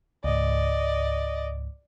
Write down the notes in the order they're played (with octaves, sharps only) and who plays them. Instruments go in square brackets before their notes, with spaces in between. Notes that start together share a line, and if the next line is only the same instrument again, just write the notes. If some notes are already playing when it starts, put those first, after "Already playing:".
[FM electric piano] C#2 G#2 [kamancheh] D5 D#5